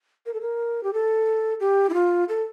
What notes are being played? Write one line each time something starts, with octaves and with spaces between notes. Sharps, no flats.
A#4
A4
A#4
G4
A4
G4
E4
F4
A4